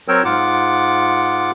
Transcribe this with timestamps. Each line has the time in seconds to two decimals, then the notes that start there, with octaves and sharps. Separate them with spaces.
0.08 F#3 C4 A#4 C#5 G5 E6
0.25 G#2 F4 F#5 D6